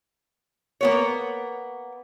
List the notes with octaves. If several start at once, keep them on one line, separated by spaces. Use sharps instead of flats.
A#3 B3 C#5